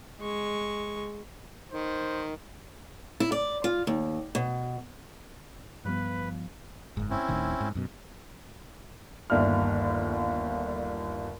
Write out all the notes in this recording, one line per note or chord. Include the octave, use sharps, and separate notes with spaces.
G#3 C#6
D#3 C5
E4
D5
F4
D#2
B2
G2 F3 G3 B3 B4
F#1 G#2
C4 C#4 E4
D1 A2 D#3
G#2
F#2 B2
G1 D#2 D5 E5 F6